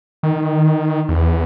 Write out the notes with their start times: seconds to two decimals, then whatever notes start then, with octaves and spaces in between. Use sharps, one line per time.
0.23 D#3
1.09 E2